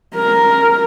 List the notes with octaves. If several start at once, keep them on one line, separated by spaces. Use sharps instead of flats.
A#4